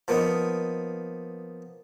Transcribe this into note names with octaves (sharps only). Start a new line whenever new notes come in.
F3 A#3 B3 D#4